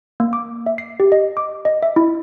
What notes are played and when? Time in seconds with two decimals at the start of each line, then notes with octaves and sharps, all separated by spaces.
0.20 A#3
0.33 D6
0.66 E5
0.78 C7
1.00 G4
1.12 D#5
1.37 D6
1.65 D#5
1.83 E5
1.96 E4